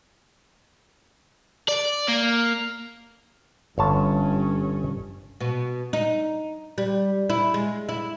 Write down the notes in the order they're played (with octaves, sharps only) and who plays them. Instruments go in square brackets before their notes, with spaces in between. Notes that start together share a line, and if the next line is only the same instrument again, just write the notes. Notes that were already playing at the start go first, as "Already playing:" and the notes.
[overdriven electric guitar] D5
A#3
[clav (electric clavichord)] G1 C#5 A5 [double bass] G2 C#4
[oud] B2
D#4
G3
E4
G#3
E4